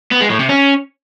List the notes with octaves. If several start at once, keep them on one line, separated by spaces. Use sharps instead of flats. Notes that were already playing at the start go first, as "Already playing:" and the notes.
B3
G#3
A2
C3
C#4